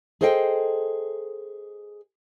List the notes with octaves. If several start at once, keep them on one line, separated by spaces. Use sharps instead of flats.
G#4 A4 C5 D#5 F#5 G5